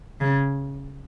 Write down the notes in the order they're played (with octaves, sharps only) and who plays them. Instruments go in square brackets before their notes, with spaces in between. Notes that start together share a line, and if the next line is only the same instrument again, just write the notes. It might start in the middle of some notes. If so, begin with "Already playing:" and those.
[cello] C#3